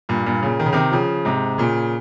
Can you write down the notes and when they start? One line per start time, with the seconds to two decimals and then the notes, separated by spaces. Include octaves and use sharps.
0.09 G2 A#2
0.26 G2 A#2
0.42 A#2 C#3
0.60 D#3
0.66 C#3
0.73 C3 D#3
0.92 C#3 F3
1.25 G#2 C3
1.58 A#2 C#3